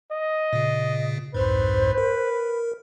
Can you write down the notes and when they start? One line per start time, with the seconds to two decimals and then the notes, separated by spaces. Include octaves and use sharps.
0.12 D#5
0.53 A#2 C#3
1.34 C2 F2 G#2 B4 C5
1.98 A#4